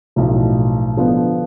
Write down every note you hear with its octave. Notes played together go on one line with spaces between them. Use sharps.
B1 A2 F3
D3 F3 B3